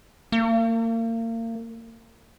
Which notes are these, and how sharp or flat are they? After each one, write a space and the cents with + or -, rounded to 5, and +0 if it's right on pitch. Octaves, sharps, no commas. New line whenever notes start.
A#3 -35